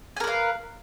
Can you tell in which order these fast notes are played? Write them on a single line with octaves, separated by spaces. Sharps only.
G#5 A#4 B4 F5